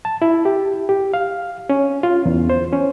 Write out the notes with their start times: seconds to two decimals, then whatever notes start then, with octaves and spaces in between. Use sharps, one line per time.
0.05 A5
0.22 E4
0.45 G4
0.89 G4
1.14 F5
1.69 C#4
2.03 F4
2.26 E2
2.50 C5
2.73 C#4